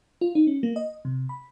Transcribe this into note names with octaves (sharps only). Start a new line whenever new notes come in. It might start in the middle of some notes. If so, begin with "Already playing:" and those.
F4
D#4
C#4
A#3
D#5
C3
B5